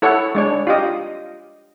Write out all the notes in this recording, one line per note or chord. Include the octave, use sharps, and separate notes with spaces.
E4 A4 C#5 F#5
G#3 D4 C#5
F4 G4 D#5